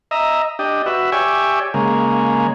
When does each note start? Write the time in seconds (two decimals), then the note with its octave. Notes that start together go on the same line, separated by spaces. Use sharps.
0.11 D#5 E5 A#5
0.59 D4 G4 D#5
0.86 F#4 B4 E5
1.12 G4 C#5 D5 E5 G#5
1.74 C#3 G#3 A#3